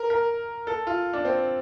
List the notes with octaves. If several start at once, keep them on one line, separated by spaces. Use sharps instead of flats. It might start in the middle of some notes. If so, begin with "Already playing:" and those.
Already playing: A#4
A#4
A4
F4
D4
C4